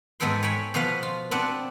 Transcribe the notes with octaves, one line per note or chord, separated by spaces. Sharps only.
G#2 G#3 B3 A4 G5 C6
C#5 G5 G#5 B5
B2 F3 B3 B4 F5
F4
B3 C4 D4 F#5 A5